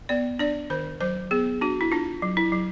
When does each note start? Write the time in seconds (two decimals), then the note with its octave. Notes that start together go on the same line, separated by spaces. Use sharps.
0.09 B3 D5
0.39 D4 D5
0.70 D#3 C5
1.01 F#3 C5
1.31 B3 G#4
1.61 D4 F#4
1.81 E4
1.92 D4 F4
2.22 F#3
2.37 E4
2.52 F#3